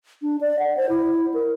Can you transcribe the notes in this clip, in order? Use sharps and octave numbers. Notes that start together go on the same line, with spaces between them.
D4
D5
F#5
C5
E4
A#4